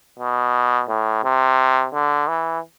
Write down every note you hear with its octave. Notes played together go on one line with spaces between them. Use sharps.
B2
A2
C3
D3
E3